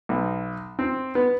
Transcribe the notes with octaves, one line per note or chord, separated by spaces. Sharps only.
B1
C4
B3